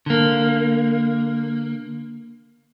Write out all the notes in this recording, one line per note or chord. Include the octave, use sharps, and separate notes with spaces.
D3 A#3